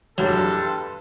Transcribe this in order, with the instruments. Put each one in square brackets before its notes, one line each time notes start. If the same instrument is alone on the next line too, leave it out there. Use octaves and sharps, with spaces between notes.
[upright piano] F1 A#1 E2 [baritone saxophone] G2 [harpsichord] F#3 [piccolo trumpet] A4
[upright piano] B4 A5 C6